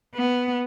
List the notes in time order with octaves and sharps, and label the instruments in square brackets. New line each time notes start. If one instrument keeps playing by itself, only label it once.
[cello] B3